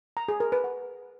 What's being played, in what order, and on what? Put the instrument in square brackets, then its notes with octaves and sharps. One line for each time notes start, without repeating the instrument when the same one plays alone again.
[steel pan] A#5
G#4
A#4
B4
F#5